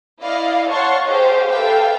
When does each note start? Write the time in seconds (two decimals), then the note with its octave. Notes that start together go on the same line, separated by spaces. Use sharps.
0.20 E4 D5 D#5 F5
0.69 C#5 F5 F#5 A5 C6 C#6
1.05 G4 G#4 C5 D#5 F5
1.50 G4 A4 B4 E5 F5 G5